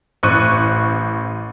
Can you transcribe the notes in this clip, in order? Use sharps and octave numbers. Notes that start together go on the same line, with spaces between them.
A1 C5 C#6 F#6 C#7 D#7